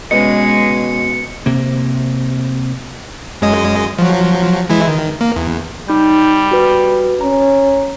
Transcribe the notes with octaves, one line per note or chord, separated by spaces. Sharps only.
B2 G#3 C#4 B4 D#5 C#7
C3 A#3
F#2 G#3 D#5
F3 F#3
E3 G#3 E4
D#3
A#3
E2
G3 D#4 G6
F#4 B4
C#4 A#5